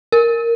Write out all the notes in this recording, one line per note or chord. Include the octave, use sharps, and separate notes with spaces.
A#4